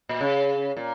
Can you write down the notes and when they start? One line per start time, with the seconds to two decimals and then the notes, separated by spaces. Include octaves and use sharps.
0.09 A#2
0.21 C#3
0.77 A#2